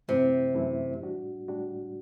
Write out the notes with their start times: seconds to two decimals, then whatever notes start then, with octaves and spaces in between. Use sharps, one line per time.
0.08 F#2 C3 E3 A3 E4
0.55 F#2 E3 A3 E4
1.01 A2 G3 D4 F#4
1.48 A2 G3 D4 F#4